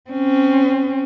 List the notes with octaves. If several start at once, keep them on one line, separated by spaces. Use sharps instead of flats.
C4 C#4